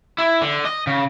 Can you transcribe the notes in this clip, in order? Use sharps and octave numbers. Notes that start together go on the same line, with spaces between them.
E4
D3
D#5
C#3